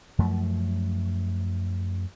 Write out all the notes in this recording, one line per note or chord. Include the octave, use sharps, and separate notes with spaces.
F#2 F3 A3